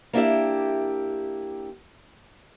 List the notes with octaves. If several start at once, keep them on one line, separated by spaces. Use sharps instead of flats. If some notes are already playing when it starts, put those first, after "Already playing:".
A#3 D4 E4 G4 E5